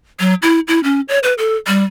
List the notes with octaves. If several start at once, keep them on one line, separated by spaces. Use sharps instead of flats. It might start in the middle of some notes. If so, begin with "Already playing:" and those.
F#3
E4
E4
C#4
C#5
B4
A4
G3